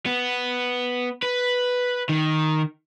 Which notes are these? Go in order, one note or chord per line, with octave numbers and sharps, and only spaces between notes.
B3
B4
D#3